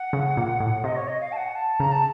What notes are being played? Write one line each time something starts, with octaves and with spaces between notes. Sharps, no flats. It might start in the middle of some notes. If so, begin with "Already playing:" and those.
Already playing: F#5
C#3
A#2
A2
C3 D#5
C#5
D#5
F5
A5
F#5
A5
C#3 A#5
A5